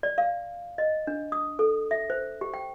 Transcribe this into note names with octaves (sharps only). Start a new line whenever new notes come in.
D5
F5
D#5
D4
D#6
A4
E5
C5
G4
G5